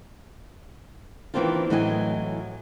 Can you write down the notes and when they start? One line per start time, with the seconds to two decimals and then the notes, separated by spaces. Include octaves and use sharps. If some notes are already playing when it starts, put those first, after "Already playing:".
1.34 D#3 E3 A#3 C4 D4 F4
1.70 A2 E3 F#3 D#5 F#5 G#5